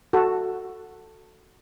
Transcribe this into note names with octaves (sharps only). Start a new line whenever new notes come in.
F#4 A4